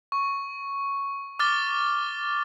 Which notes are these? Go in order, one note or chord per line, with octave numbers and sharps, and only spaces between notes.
C#6
D6 F6 A6 G7